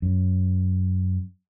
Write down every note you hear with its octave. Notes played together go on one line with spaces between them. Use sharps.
F#2